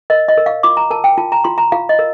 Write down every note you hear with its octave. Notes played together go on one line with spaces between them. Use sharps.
A#4 D#5
D#5
A#4
F5
F4 D6
A#5
A#4 A5
G5
F4 A5
A#5
F4 C6
A#5
F4 F5
D#5
A#4